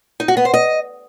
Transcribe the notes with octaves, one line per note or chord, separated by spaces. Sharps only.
D#4
F#4
B3
C5
D#5